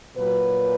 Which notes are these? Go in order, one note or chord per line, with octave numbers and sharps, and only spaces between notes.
A#2 F#3 B4